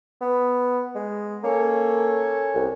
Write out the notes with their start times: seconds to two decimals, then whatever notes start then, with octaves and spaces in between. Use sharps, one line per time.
0.21 B3
0.95 G#3
1.43 A#3 C#4 A4 C#5
2.55 C2